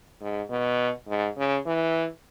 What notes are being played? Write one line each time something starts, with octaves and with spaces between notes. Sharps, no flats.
G#2
B2
G#2
C#3
E3